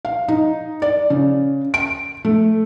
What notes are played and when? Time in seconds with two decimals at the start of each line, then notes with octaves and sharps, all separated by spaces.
0.05 F5
0.28 D#4
0.82 D5
1.10 C#3
1.74 D7
2.25 A3